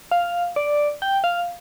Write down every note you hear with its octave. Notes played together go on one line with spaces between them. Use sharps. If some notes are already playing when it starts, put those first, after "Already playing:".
F5
D5
G5
F5